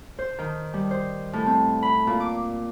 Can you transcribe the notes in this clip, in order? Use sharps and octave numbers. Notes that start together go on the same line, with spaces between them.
C5
D#3
G3
C5
A2
C4
B5
A#2
D6